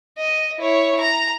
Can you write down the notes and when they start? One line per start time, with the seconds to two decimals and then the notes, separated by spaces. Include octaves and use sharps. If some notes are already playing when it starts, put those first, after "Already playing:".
0.19 D#5
0.58 E4 C#5
1.00 A#5